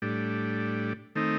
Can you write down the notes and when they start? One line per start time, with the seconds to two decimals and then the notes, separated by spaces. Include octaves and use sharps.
0.02 A2 G3 D4
1.15 D#3 A3 C4 D#4